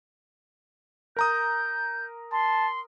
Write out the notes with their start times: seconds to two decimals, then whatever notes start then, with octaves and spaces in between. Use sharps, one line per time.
1.16 A#4 A#5 D#6 G6
2.32 A5 C6